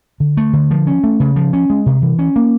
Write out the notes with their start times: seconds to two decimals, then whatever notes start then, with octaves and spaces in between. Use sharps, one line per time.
0.20 D3
0.37 A3
0.53 D3
0.71 F3
0.87 C#4
1.04 A3
1.20 C#3
1.36 F3
1.53 C#4
1.70 G#3
1.86 C3
2.02 E3
2.19 C#4
2.36 A#3